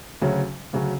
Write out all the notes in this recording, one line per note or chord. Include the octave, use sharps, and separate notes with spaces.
D2 C#3 F#3 C#4
D2 C#3 F#3 C#4